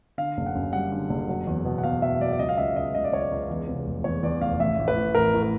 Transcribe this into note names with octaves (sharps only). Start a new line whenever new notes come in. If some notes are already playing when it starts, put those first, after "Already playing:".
D3 F5
F#1
F#5
F#2
G3 F#5
D3
F#1
F#3
E2
B2
F#5
E2 F5
B2 E5
F#3 D5
D5
C#2 D#5
F5
C#2 E5
C#2 D#5
C#2 D#5
D5
C#2 C#5
D5
C#2
E2
C3
F1
E2 C#5
E2 D5
F1 F5
A1 E5
A1
B4
A2
A1 A#4
A2
A#4